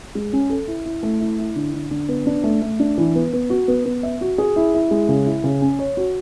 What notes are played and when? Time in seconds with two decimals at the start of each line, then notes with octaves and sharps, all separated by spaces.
0.15 G#3
0.33 C#4
0.50 A4
0.67 E4
0.85 E4
1.03 A3
1.21 E4
1.39 E4
1.56 D3
1.74 D3
1.91 D3
2.08 B3
2.26 D4
2.44 A3
2.62 A3
2.79 D4
2.98 E3
3.15 B3
3.33 B3
3.50 F#4
3.68 B3
3.85 B3
4.03 E5
4.21 F#4
4.38 G#4
4.56 E4
4.74 E4
4.91 G#3
5.09 C#3
5.26 E4
5.44 C#3
5.62 C#4
5.79 C#5
5.97 F#4